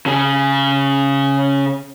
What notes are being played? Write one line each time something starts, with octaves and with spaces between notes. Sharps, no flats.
C#3 G#4